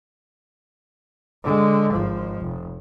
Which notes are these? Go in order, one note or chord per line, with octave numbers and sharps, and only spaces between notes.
D3 G#3
G#1 F3
F1